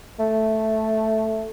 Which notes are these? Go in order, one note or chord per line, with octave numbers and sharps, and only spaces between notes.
A3